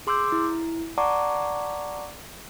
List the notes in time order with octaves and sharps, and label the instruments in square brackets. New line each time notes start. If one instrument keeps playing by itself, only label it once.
[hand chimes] G#4 C6 D6 E6 G6
E4
D5 F#5 A5 A#5 C#6 D6